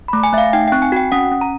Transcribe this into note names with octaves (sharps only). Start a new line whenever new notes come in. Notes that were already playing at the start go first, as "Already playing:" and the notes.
A3 B5
G#5
A3 E5 F5
D#4 G5
C4 G5
G#5
F#4 G5
C#4 F#5
C#4
A#5